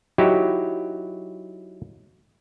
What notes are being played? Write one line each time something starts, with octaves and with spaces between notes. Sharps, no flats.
F#3 D#4 E4 F#4 G4